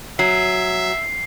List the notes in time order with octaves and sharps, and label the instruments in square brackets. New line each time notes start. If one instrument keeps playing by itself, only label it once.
[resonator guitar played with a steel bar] F#3 [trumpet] E5 [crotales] C7